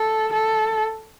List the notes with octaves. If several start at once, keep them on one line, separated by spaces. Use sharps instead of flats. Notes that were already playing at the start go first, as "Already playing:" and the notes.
Already playing: A4
A4